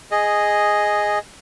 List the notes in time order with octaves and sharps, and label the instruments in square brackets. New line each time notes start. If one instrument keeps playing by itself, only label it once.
[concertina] G#4 D#5